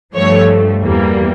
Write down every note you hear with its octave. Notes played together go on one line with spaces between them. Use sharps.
G2 F3 A3 C#5
E2 E3 G3 A#3